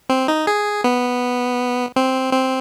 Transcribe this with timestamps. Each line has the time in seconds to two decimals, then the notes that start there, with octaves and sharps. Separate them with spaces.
0.09 C4
0.28 D#4
0.47 G#4
0.84 B3
1.96 C4
2.33 C4